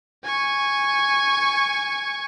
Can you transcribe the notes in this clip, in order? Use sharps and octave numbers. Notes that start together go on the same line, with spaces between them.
G#5 C#6